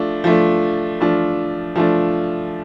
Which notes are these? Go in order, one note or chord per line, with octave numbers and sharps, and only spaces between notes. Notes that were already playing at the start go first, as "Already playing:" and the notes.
Already playing: F3 A3 D4
F3 A3 D4
F3 A3 D4
F3 A3 D4